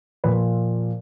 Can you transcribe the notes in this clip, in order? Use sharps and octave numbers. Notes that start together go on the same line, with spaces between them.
A#2 F3 B4